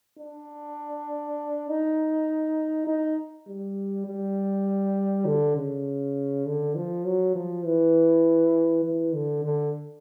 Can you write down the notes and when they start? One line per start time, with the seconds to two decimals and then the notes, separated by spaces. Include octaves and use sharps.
0.19 D4
1.69 D#4
2.87 D#4
3.48 G3
4.07 G3
5.26 D3
5.56 C#3
6.46 D3
6.75 F3
7.05 F#3
7.36 F3
7.65 E3
8.85 E3
9.14 D3
9.45 D3